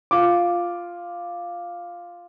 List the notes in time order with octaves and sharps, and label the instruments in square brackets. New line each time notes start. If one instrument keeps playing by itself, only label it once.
[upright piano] F4 D6